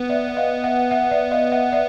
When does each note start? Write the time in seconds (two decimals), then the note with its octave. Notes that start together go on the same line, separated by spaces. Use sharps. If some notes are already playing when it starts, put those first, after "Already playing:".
Already playing: B3
0.09 D5 E5
0.28 F#5
0.36 D#5 F5
0.64 E5 F#5
0.91 E5 F#5
1.11 D5 E5
1.31 D#5 F5
1.52 E5 F#5
1.72 D5 E5